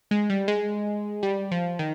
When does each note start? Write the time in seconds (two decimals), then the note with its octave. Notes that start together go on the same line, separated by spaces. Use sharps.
0.11 G#3
0.30 G3
0.48 G#3
1.23 G3
1.51 F3
1.79 D#3